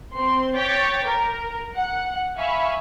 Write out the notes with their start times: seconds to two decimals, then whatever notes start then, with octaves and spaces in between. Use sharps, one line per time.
0.14 C4 C6
0.57 C#5 G5 D6 A6 B6
1.05 A#4
1.75 F#5
2.38 E5 F5 G#5 B5 C#6